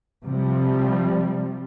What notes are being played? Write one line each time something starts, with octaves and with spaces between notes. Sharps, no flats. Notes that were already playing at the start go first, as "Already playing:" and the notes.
C3 F3 G3